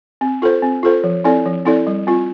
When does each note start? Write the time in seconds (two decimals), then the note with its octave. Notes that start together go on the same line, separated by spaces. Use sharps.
0.21 C4
0.42 F4 A4 C5
0.63 C4
0.83 F4 A4 C5
1.04 F3
1.24 C4 E4 A4 D5
1.46 F3
1.65 C4 E4 A4 D5
1.87 G3
2.07 C4 F4